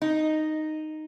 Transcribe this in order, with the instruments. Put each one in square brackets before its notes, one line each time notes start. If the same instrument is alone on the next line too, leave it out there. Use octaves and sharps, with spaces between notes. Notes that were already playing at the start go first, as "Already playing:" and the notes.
[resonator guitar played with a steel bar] D#4